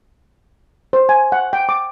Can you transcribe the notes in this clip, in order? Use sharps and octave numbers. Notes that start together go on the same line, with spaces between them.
C5
G#5
F#5
G5
D6